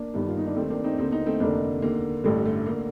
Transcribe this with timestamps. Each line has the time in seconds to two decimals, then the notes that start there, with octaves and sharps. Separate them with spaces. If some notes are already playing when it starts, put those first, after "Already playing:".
Already playing: A#3 D4
0.14 G1 G2 D#3
0.28 F4
0.37 D#4
0.46 D4
0.56 D#2 D#3 A3 C4
0.70 A#3 D4
0.84 C4 D#4
0.98 D#2 D3 C4 D#4
1.12 C4 D#4
1.26 A3 C4
1.40 F1 D#2 D3 A#3 D4
1.82 D#2 D3 A#3
2.24 A1 G2 D3 A3
2.45 A3
2.66 D3 A#3